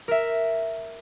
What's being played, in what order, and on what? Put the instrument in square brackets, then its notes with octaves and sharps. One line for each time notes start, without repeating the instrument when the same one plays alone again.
[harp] A#4 E5